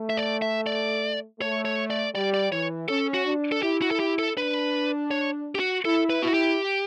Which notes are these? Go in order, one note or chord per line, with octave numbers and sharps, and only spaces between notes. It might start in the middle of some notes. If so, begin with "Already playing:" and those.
Already playing: A3
E5
D5
E5
D5
A3 C#5
C#5
D5
G3 D5
D5
E3 C#5
C#4 A4
F#4
D4
A4
E4 G4
F#4
A4
G4
A4
D4 B4
C#5
G4
F#4
E4 A4
B4
E4 F#4
G4